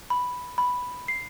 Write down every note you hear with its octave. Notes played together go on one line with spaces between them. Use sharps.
B5
B5
C7